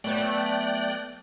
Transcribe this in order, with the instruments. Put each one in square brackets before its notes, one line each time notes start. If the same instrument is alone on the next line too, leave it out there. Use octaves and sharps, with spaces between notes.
[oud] F#3 B3 C#5 [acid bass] A3 [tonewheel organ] D5 G5 F#6